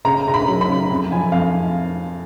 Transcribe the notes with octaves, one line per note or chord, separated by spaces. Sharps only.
C#3 A#5
C#3 A#5
B5
F#3
B5
C#3
F2
F3 G#5
F2 F5